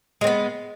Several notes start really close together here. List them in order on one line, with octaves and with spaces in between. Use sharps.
G#3 C4 B3